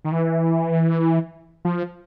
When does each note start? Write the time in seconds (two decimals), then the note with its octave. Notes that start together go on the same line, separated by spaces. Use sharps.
0.05 D#3
0.12 E3
1.65 F3